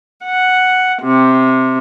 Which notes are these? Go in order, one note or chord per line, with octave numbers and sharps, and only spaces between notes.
F#5
C3